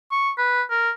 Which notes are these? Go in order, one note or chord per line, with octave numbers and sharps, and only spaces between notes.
C#6
B4
A#4